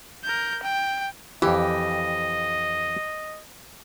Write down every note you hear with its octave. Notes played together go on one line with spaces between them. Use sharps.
A#4 G6
G5
F2 E3 G4 D#5